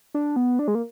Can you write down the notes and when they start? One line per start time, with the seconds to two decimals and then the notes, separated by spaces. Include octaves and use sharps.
0.14 D4
0.36 B3
0.59 D4
0.68 G#3
0.75 A#3